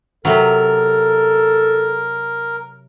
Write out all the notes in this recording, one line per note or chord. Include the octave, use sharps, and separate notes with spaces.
C3 F#3 A4 A#4